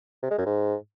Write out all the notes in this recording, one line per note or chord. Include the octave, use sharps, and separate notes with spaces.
C3
G#3
F#2
G#2